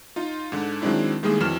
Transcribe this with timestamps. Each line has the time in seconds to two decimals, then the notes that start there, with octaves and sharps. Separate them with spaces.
0.16 D#4 F4
0.52 G#2 D3
0.82 D#3 F#3 G#3 C4 D4 E4
1.23 A2 D#3 G3 G#3 A#3 G#4
1.40 F2 E3 F#3 F6 E7